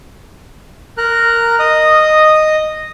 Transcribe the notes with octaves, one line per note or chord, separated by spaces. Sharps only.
A#4 A#5 F#6
D#5 D#6